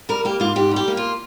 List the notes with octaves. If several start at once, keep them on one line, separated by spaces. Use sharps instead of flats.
G3 A#4
A#3 G4
G#2 F4
G#2 G4
G3 G4
A#3
F4